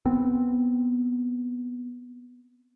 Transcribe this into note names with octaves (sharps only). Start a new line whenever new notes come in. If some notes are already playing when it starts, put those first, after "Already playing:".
B3 C4